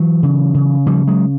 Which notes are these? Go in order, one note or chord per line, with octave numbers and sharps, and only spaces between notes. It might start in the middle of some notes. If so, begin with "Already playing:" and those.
Already playing: E3 F#3
C#3
C#3
C#3 F3 G3
F#3 G#3